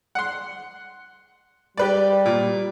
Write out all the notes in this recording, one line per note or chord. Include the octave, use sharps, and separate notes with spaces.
F#5 C6
G3 G4 B4 D5
A#2